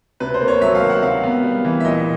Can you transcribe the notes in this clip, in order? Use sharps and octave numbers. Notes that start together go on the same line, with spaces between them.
C3 B4
C5
A#3
C#5
F#3 E5
F5
D#3
F#5
C3 F5
B3
G3
E3
E5
A#2 D#5